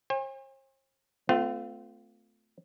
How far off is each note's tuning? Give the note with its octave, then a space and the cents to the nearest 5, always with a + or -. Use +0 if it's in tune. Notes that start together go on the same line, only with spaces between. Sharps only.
C5 +45 G#5 -45
A3 +0 C4 -45 F4 +0